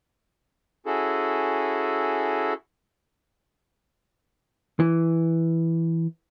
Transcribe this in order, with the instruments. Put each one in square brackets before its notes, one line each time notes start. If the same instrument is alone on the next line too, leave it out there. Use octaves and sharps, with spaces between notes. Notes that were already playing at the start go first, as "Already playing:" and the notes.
[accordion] C#4 E4 F#4 G#4 A4
[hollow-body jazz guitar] E3